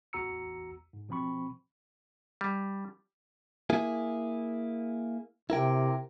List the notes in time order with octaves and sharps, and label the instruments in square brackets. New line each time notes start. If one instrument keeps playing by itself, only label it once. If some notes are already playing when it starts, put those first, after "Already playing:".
[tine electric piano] A1 E2 F#4 A#5 E6 C#7
G#2
B2 F3 C4 B5 C#6
[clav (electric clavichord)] G3
[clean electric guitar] A#3 E4 G#4
[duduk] C3 [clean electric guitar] E4 A#4 G5